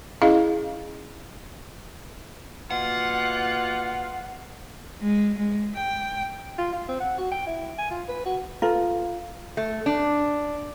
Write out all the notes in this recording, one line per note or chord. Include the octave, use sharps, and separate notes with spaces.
C#4 E4 G#4 D#5 F5
B2 A#3 F4 F#5
G#3
G#3
G5
F4
F4
C4
F#5
F#4
G5
E4
G#5
F4
B4
F#4
F4 A4 B4 A#5
A3
D4